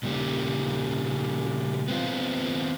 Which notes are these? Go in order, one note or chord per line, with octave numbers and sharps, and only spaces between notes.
A#2 C#3 G3
B3 C4 F4